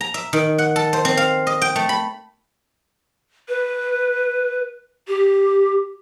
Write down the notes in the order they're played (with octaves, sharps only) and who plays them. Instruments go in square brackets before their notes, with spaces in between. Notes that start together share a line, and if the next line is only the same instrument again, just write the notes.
[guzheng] A#5
E5
D#3
F#5
A4
C5
C4
F5
D#5
G5
A3
B5
[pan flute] B4
G4